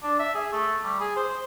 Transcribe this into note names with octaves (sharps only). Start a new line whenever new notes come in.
D4
E5
G#4
A3
G3
G#4
C5